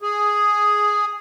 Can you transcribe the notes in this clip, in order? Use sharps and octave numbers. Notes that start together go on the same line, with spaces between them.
G#4